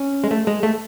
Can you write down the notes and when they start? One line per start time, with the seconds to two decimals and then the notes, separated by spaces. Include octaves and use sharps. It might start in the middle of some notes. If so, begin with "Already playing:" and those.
Already playing: C#4
0.24 G#3
0.31 A3
0.47 G#3
0.63 A3